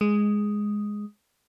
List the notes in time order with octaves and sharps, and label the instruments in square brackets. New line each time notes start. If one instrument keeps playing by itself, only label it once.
[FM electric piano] G#3